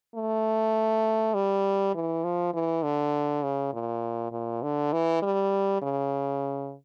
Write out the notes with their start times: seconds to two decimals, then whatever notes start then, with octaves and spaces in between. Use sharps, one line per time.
0.15 A3
1.35 G3
1.95 E3
2.24 F3
2.54 E3
2.84 D3
3.43 C#3
3.73 A#2
4.32 A#2
4.63 D3
4.93 E3
5.22 G3
5.82 C#3